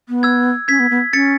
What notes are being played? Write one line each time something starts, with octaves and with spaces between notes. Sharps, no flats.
B3
E6 G#6
C#4 G#6 B6
B3
B3
C#4 A6 C#7